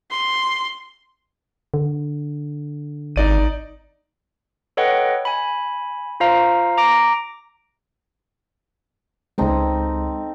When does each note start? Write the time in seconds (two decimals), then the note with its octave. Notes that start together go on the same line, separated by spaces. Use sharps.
0.11 C6
1.74 D3
3.16 G#1 D#4 D5 D#7
4.77 A4 B4 C#5 D#5 F#5 G5
5.25 G#5 B5
6.20 F4 C5 F5 A#5
6.78 A#5 D6 A#6 D7
9.38 C#2 G#3 C4 D#4 A4